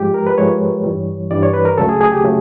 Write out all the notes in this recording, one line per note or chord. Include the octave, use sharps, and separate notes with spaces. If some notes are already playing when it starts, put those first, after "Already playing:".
Already playing: G#2 F3 G#3 G4
A#4
B4
G#2 F3 G#3 C#5
G2 E3 G3
G2 E3 G3 D5
C#5
B4
A#4
D2 C#3 F#3 A3 A4
G#4
G#4
G4
C#3 F#3 A3